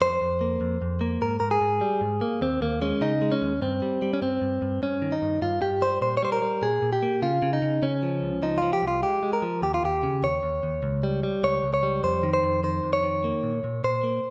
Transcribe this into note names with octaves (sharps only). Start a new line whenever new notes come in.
F2 C5
F2
A#3
F2
F2
A#3
G#2 A#4
G#2 A#4
G#4
G#2
G3
G#2
A#3
D#2 C4
D#2 A#3
G#3 C#4
C#3 D#4
G#3
C#4
D#2
G2 C4
G3
G3
C#4
G2 C4
G2
G2
G2 C#4
D#3
D#4
G2
G2 F4
G2 G4
G3 C5
A#2 C5
C#5
G3 C5
A#4
G3
A#2 G#4
A#2
G4
A#3
C#3 F4
C#3
D#4
C#3
C#3 C#4
F3
C#2
F3 D#4
F3 F4
G4
C2
F4
G#3 G4
G#3
A#4
F3
D#2 G4
F4
D#2 G4
C#3
D#2 C#5
D#2
D#2
C#2
G3
G3
C#2 C#5
C#2
C#5
G3
F2 C5
D#3
C5
F2
D#3 C5
F2
C#5
D#3
A#3
A#2
A#2
A#2 C5
A#3